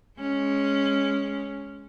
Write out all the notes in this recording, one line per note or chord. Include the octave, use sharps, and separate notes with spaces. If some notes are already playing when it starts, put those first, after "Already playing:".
G#3 C#4